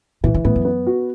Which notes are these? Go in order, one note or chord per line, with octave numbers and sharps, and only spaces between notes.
B2 E3
C#3
A2 B3
F#2
B3
F#4